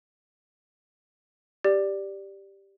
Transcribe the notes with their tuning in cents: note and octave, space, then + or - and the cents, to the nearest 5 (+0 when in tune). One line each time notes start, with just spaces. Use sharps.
G4 +0 D5 +0